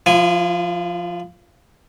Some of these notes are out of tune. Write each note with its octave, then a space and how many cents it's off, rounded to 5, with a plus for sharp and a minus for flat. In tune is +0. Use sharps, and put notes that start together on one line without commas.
F3 +0 E4 +45 G#5 -10